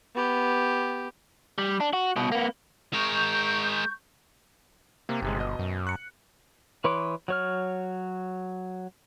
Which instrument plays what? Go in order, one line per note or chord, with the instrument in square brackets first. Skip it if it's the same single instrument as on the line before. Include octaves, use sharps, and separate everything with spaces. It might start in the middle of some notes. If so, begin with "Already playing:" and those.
[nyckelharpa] B3 G4
[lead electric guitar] G3
D4
F#4
C2 B2
A#3 B3
[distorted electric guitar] G#3 A#4 [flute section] C#6 G6
[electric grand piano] C3 [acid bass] A#3
[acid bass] G1 [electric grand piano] D#2 C3 G#3
[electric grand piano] B2 D#5
[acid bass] F#2
[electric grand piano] F#6 C#7
[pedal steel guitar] E3 B4 C#5 C6 D6
F#3 C#5 F6